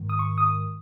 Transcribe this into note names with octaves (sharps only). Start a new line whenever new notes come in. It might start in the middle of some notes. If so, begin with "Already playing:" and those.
Already playing: G#2 D#3
D#6
C#6
D#6